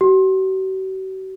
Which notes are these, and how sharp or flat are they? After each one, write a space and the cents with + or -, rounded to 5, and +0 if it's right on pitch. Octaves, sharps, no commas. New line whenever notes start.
F#4 +45